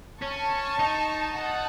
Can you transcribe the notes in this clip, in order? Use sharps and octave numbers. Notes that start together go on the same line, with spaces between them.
C#4 A5 C#6
D#4
F#5 A5